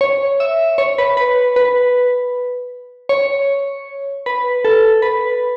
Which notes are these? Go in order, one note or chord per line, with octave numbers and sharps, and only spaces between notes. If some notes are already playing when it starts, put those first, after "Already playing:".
C#5
E5
C#5
B4
B4
B4
C#5
B4
A4
B4